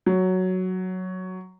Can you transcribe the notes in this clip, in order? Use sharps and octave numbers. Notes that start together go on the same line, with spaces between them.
F#3